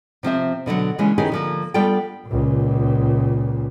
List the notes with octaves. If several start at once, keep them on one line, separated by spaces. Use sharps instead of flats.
C3 F3 C4 E5
B2 D3 D#3 F#3
C#3 E3 G#3 A#3 C#4 D4
D#3 C#4 E4 G4 G#4 B4
D3 F3 A#3
G3 B3 D4 F4 A4 G5
C#2 A#2